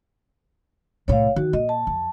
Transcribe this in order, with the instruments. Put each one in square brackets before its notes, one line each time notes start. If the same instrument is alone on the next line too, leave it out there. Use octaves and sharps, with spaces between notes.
[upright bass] C2 A2 [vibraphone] C#5 F5
[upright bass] D#3 [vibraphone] F#4
[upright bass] A#2 [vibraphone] D#5
[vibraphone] A5
[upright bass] F2